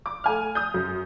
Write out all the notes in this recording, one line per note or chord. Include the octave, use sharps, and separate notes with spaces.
D6
A3 G#5 F6
D#6 G6
F#2